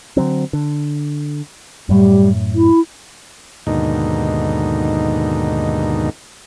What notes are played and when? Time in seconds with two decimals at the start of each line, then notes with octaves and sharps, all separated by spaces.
0.17 D3 F#3 C4
0.53 D3
1.89 F#2 A2 G3
2.55 E4
3.67 D#2 G#2 B2 D3 D#4